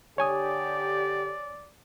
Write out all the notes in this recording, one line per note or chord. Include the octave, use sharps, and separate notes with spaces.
D3 G4 C#5 D5 G#5 D#6